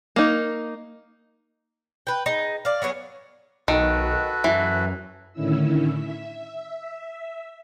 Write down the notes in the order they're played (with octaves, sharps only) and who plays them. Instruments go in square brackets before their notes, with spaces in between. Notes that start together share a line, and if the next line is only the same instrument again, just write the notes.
[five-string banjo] A#3 D#4
[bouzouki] B4 G5
D#4 G#4
D5 F5
F#3 B3 C#4 G#4
[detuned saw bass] B1 [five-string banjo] D#3 [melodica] F#4 A4 B4
[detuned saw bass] F#2 [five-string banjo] E3
[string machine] A2 D3 D#3 C#4 E4 E6
E5